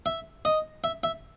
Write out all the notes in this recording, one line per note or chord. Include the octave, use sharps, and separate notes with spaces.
E5
D#5
E5
E5